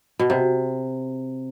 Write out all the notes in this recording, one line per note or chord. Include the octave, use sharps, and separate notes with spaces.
B2
C3